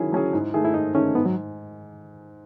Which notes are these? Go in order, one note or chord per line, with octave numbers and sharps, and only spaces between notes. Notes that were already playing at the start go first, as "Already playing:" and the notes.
Already playing: D#3 F#3 C#4 E4 G#4
F#3 C#4 G#4
G#2
D#3 A3 D#4 G#4
E4
G#2 D#4
D#3 A3 C#4 D#4 G#4
G#2 B3
F#3